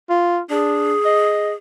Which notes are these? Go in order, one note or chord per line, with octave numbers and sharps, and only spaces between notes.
F4
D4 G#4
D#5